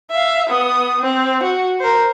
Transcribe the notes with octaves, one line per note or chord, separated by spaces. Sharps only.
E5 F5
B3 D#6
C4
F#4
A#4 C5